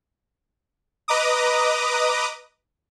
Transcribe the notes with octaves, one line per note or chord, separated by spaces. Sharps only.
B4 D#5 A#5 D6 D#6